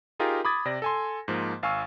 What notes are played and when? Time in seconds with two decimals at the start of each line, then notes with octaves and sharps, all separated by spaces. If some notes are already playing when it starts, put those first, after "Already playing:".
0.19 D#4 F4 G4 G#4 A#4
0.45 B5 D6 D#6 G#6 A6
0.65 C3 D5 A#6
0.82 A4 G#5 C6
1.28 G#2 F3 A#3
1.63 G#1 F5 G#5 C#6 E6